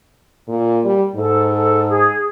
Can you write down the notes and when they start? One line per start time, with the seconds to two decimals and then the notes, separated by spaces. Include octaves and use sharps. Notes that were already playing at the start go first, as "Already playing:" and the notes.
0.48 A#2
0.84 G3
1.15 G#2 A4
1.54 A4
1.89 G#4